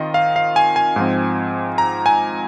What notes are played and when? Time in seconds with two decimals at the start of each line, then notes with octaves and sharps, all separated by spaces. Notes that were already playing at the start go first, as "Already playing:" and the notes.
Already playing: D#3 C4 F4 D#5
0.14 F5
0.36 F5
0.56 G#5
0.76 G#5
0.96 G#2 F3 C4
1.78 A#5
2.06 G#5